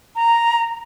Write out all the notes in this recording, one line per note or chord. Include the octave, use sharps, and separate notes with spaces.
A#5